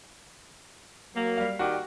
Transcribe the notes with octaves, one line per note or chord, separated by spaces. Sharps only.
F#3 A#3
G3 F5
D#3 F#4 G4 D5